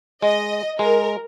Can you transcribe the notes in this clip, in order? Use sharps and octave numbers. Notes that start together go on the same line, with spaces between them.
G#3 D#5
G#3 A#4